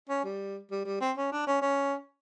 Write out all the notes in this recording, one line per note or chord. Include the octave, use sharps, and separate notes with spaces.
C#4
G3
G3
G3
C4
C#4
D4
C#4
C#4